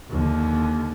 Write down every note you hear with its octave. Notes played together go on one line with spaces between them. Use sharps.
D#2 D3